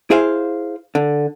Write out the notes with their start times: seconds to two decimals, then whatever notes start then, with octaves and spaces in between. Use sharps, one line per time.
0.10 E4 G#4 C5 F5
0.95 D3